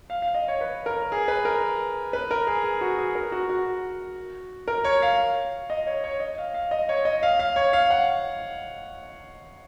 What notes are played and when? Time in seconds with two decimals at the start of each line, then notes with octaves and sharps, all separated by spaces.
0.10 F5
0.22 F5
0.35 D#5
0.48 C#5
0.61 B4
0.86 A#4
1.12 G#4
1.28 B4
1.45 A#4
2.13 B4
2.31 A#4
2.47 G#4
2.64 G#4
2.81 F#4
2.99 G#4
3.15 A#4
3.32 F#4
3.49 F#4
4.68 A#4
4.84 C#5
5.02 F5
5.70 D#5
5.87 C#5
6.04 C#5
6.20 D#5
6.38 F5
6.54 F5
6.71 D#5
6.89 C#5
7.05 D#5
7.23 F5
7.39 F5
7.56 C#5
7.73 F5
7.90 F#5